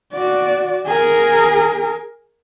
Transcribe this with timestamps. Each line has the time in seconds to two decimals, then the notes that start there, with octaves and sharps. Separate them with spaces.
0.13 F#4 D5
0.86 G#4 A#4